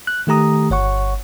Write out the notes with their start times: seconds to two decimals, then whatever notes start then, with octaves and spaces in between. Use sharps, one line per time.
0.07 F#6
0.27 D#3 A3 G4 A#5 D#6
0.70 G1 C#5 F#5 C#6